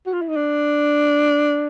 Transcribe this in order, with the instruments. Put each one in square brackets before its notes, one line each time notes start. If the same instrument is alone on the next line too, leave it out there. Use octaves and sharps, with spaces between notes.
[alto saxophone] F#4
F4
E4
D#4
D4